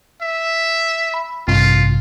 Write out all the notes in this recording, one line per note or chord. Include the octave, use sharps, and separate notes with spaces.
E5
B5
A1 G2 C3 F4